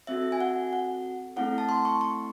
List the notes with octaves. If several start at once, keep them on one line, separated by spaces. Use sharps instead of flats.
C4 F#4 A4 E5
G#5
F#5
F#5
A3 C4 E4 A4 F#5
A5
C6
C#6
C#6